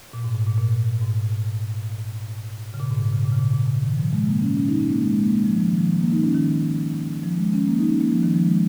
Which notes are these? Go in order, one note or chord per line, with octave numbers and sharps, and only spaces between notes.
A#2
G#2
G#2
A#2
A#2
G#2
C#3
A#2
G#2
A#2
C#3
A#2
C#3
A#2
A#2
C#3
D#3
F3
G#3
A#3
C#4
C#4
D#4
C#4
A#3
G#3
G#3
A#3
G#3
F3
F3
D#3
F3
A#3
D#4
C#4
D#3
F3
G#3
C#4
A#3
D#4
C#4
A#3
F3
D#3
F3
G#3